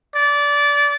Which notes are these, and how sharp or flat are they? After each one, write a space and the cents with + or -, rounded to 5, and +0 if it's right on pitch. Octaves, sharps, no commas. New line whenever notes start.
D5 -20